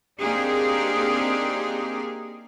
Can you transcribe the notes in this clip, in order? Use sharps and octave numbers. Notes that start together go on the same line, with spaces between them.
A#3 C4 D4 D#4 G4 G#4